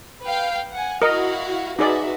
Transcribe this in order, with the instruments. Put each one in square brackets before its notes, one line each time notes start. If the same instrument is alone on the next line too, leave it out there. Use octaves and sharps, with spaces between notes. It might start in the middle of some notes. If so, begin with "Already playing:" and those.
[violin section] B4 F5 G5
F#5 G#5
[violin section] E4 F#4 F5 [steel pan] A#4 D#5
[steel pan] D#4 G#4 D5 [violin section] F#4 B4 E5